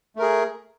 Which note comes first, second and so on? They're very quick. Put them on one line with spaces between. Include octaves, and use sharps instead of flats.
A3 A#4 G#4